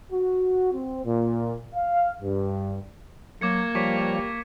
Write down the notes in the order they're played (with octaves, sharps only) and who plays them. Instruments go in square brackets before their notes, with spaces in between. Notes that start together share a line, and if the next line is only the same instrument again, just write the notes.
[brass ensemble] F#4
C4
A#2
F5
G2
[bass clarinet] F#3 [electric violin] A#3 [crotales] D6 G#6 C#7
[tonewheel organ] F3 G3 C#5 [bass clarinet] G4 [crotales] C#6 D6 B6